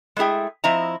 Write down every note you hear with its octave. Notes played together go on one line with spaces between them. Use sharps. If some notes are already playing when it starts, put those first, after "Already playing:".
G#3 A3 E4 G#4 G5
F3 C4 E4 D#5 A#5